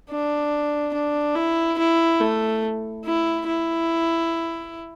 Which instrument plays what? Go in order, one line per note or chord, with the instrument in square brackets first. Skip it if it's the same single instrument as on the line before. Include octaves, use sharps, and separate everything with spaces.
[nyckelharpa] D4
D4
E4
E4
A3
E4
E4